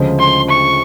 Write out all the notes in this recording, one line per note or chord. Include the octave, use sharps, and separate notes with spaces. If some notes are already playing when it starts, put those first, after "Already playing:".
Already playing: D2 C#3 F3 G#3
C6
C#6